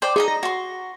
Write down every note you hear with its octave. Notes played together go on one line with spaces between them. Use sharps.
C5 D5 G5
D#4 G#4 D#5 A#5
A#6
F#4 C6